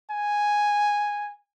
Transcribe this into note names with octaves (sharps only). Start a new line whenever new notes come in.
G#5